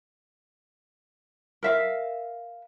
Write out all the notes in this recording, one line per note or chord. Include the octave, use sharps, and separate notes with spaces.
A#4 E5 F5